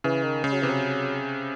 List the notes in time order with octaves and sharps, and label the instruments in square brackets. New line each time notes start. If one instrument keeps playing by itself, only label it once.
[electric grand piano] C#3 [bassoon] E3
[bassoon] D#3
[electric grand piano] C#3 [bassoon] G#3
[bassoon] F#3
[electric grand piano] C3 [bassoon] E3
[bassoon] F#3